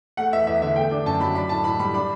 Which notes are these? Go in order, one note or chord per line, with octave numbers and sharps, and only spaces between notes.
A3 F#5
E2 E5
E2 E5
D3 E5
A3 G5
D4
F#2 A5
F#3 B5
D4 B5
A2 A5
A2 B5
G3 B5
D4 B5